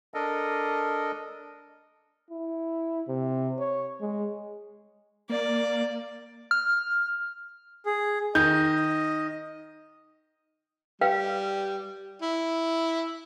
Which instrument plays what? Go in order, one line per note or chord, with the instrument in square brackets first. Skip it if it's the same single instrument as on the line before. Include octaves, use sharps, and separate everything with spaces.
[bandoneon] D4 A4 A#4 D#5
[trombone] E4
C3
C#5
G#3
[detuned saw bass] A#3 [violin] D5
[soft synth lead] F6
[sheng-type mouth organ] G#4
[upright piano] D#3 G6 [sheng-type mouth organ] D#5
[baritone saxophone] G3 [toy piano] B4 F5 G5
[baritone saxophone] E4